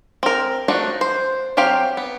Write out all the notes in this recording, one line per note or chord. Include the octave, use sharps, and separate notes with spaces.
C4 A#4
F3 A3 D4 D#4 F#4
C5
F#3 C4 G4 F5
B3